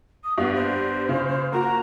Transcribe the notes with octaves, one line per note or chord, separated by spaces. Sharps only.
D#6
G2 B3 F5
C5
C#3
A#3 F#4 A#5